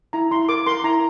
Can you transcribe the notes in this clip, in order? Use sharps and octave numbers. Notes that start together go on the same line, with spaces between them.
E4 A#5
E4 C6
A#4 D6
A#4 C6
E4 A#5